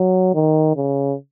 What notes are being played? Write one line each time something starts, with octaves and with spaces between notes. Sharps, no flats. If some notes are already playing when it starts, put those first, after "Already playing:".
Already playing: F#3
D#3
C#3